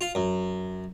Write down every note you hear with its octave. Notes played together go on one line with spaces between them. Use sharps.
F4
F#2